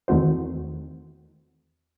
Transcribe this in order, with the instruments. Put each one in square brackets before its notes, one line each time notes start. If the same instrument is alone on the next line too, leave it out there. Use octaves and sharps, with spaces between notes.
[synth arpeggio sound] E2 D#3 A3 C4 F#4 C5